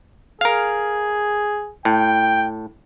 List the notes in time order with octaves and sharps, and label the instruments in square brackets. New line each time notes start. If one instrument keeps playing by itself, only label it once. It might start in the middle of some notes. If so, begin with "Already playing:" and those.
[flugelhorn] G#4 [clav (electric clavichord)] A#4 F5
[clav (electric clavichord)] A2 [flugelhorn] G5